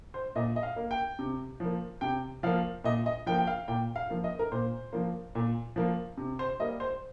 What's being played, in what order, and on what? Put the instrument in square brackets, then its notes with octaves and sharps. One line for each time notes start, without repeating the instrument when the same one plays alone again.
[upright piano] C5
A#2 D#5
D#5
F5
A#3
G5
C3
F3 A#3
C3 G5
F3 A#3 F5
A#2 D#5
D#5
F3 A#3 G5
G5
F5
A#2 G5
F5
F3 A#3
D#5
A#4
A#2 C5
F3 A#3
A#2
F3 A#3
C3
C5
G3 A#3 D#5
C5